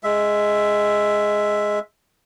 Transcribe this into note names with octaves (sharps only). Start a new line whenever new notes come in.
G#3 E5